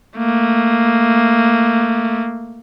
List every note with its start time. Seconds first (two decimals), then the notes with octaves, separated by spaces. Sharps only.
0.17 A3 A#3